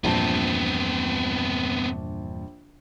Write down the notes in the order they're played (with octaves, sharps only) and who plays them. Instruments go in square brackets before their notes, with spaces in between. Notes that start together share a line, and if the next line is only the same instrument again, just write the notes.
[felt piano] A#1 A5 [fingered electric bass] E2 G2 A#2 [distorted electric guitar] B3 C4